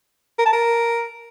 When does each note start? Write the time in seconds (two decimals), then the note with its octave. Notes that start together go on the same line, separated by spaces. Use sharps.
0.39 A#4
0.46 A5
0.53 A#4